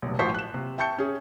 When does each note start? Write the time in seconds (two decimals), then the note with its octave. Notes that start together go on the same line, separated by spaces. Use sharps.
0.02 F1 B1
0.19 A1 F3 F#3 C5 C#6 B6
0.35 F#6 E7
0.54 C3
0.78 E5 G5 A5 C#6 G6 C#7
0.98 C#4 G#4